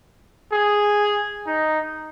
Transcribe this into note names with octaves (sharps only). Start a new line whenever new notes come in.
G#4
D#4